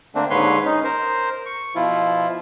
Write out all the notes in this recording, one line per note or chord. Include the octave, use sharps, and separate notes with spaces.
D3 A3 A#3 C4 D4
D#2 G#2 D3 B4 C#5 C6
C#4 D#4
A#4 C5
C#6
B2 F3 E4 F4